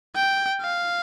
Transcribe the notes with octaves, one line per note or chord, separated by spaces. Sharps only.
G5
F5